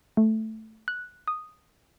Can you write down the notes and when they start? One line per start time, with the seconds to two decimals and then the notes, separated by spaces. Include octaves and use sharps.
0.17 A3
0.88 F#6
1.28 D#6